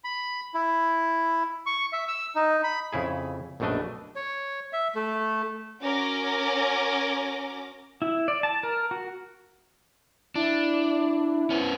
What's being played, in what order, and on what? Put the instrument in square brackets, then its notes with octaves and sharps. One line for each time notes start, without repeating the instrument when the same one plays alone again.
[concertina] B5
E4
C#6
E5
E6
D#4
B5
[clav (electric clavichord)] F2 C#3 E4 G#4
A#1 F#2 B2 A3 D4 D#5
[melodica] C#5
E5
A3
[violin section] C#4 F#4 A#4 D6 A#6
[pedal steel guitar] E4
D5
A5
A#4
F#4
[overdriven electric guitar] D4 [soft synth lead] E4
[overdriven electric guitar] B3 C#4